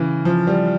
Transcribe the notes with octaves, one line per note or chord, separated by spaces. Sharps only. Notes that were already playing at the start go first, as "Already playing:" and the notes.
Already playing: C#3 E3
F3
G3